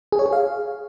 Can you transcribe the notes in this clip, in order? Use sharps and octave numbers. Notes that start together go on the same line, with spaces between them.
G#4
C#5
G#4
F5